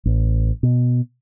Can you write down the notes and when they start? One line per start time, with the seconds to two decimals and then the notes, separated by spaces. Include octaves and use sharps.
0.05 A1
0.63 B2